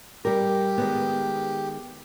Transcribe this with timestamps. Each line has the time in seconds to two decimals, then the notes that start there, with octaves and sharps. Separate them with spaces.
0.25 G3 G4 A#4
0.78 D#3 G#3 B3